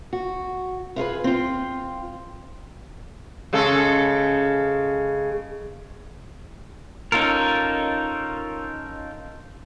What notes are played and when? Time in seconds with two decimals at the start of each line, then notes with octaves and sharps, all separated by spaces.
0.13 F#4
0.96 E4 F4 G#4 B4
1.24 C4 F4
3.53 C#3 G#3 A4
7.12 C#4 D#4 F4 A4 A#4